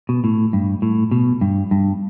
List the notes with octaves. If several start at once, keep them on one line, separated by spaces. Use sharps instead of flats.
B2
A2
G2
A2
B2
G2
G2